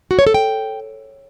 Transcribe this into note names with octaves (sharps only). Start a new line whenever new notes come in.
F#4
C#5
A4
G5